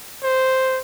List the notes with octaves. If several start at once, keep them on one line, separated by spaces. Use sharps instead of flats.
C5